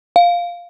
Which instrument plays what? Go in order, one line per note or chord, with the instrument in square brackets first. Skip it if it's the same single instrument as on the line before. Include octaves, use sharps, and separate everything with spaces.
[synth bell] F5